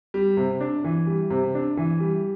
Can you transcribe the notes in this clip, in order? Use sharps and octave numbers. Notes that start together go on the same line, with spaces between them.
G3
C3
D4
E3
G3
C3
D4
E3
G3